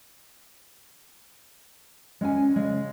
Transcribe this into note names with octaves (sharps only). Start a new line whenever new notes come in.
G#3 C#4 G#5
C#3 G#3